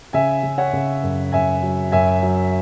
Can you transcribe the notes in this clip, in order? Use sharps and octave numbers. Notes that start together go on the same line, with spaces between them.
C#3 E5 G#5
C#3
C#5 F#5
C#3
F#2
F#2 E5 G#5
F#3
F#2 E5 G#5
F#3